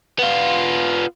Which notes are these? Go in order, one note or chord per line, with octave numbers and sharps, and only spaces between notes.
B3 F4